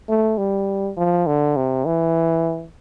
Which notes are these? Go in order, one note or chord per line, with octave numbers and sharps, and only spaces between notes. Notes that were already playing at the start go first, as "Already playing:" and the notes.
A3
G3
F3
D3
C3
E3